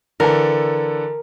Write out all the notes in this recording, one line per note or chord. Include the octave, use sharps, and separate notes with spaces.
D3 E3 A4 A#4